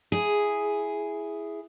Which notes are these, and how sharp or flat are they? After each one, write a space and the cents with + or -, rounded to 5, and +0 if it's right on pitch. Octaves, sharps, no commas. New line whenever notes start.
E4 +5 G#4 +0